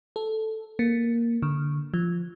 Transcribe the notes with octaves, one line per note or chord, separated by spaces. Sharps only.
A4
A#3
D3
F3